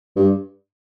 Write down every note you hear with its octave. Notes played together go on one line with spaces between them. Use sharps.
G2